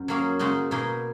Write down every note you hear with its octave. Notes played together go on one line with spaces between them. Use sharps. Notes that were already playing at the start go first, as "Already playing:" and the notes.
Already playing: F#2
F#3 A#3 C#4 G#4
C#3 G#3 D#4 F#4
B2 A#3 D#4 G#4